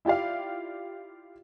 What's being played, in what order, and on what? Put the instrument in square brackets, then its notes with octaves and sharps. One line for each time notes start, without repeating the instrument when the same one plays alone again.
[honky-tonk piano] E4 F4 G4 D5 F5